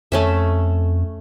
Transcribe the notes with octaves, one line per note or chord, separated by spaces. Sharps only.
F2 A3 C#4 E5